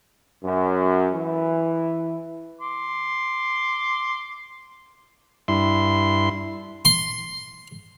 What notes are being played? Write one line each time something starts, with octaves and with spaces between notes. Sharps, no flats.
F#2
E3
C6 D6
G2 E4 C6
C6